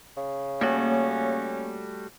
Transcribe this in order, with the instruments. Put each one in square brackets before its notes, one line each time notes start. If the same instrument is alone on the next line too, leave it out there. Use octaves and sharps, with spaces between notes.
[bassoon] C#3
[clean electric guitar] G3 A3 F#4 [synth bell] A#3 [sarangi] C#4